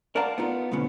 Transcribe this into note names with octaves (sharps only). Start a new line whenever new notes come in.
A#4 D5 F5 F#5 A5 A#5
B3 D#4 F4
B1 F2 D3 B3 C#4